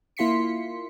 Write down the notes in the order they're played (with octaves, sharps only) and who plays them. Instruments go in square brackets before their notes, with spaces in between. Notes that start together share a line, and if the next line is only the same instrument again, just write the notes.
[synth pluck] A#3 E4 F4 C6 B6 C#7